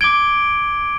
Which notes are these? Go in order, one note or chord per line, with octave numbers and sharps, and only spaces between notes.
D6 G#6 D7 G7